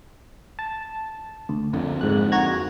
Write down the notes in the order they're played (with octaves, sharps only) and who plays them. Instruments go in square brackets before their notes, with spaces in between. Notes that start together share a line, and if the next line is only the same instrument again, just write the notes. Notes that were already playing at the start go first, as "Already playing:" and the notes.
[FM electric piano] A5
D2
[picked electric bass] F2 D3
[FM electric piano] G#2 F#6
F#4 A#5 G#6